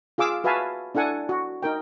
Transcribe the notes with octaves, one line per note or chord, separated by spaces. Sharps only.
F4 G#4 F5 D6 E6
F#4 B4 E5 F5 G#5 A5
D4 E4 A4 F#5 G#5
F#4
D#4 A#4 G5